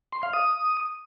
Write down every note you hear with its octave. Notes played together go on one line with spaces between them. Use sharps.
C6
F5
D#6